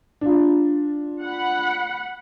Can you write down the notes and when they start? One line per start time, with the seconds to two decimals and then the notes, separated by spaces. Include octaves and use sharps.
0.21 D4 F4
1.23 F#5 B5